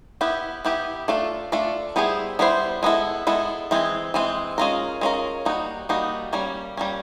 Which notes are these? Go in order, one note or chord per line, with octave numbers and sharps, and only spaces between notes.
B3 E4 G4 B4
B3 E4 G4 B4
A3 D4 F4 A4 D5
A3 D4 F4 A4 D5
G3 B3 E4 G#4 C5
G3 B3 E4 G#4 C5
G#3 B3 E4 A4
G#3 B3 E4 A4
E3 G#3 C4
E3 G#3 C4
G#3 C#4 F4 A#4
G#3 C#4 F4 A#4
G3 A#3 D#4 F#4
G3 A#3 D#4 F#4
G3 A#3 C#4
G3 A#3 C#4